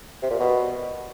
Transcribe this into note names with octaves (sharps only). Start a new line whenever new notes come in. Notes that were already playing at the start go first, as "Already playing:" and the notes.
C3
A#2
B2